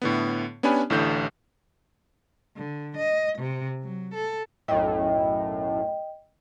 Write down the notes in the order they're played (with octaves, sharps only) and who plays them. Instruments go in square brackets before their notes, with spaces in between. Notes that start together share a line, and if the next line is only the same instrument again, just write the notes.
[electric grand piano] A2 D3 B3
B3 C#4 D4 G4 G#5 B5
A1 A2 D3 G6
[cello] D3
D#5
C3
F#3
A4
[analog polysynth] B1 F#2 A2 [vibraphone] D#5 G5